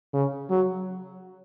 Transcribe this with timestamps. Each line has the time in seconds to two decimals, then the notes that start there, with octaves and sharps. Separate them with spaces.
0.13 C#3
0.50 F#3